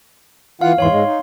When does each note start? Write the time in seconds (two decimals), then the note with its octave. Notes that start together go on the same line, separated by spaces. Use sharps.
0.61 E3 F4 F5 F#5
0.78 E2 G#2 E3 C#5 F5 C6
0.90 G#2 G#3
1.07 D#4